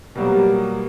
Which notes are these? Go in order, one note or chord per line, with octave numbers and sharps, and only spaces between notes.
B2 F#3 G3 A#3